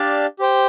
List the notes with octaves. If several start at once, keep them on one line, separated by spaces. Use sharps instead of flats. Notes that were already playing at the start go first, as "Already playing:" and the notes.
Already playing: D4 G4 D5 F5 A5
G4 C5 G5